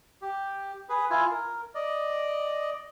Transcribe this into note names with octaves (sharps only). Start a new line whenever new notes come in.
G4
G#4 B4
E4 F4 G#5
A#4
D5 D#5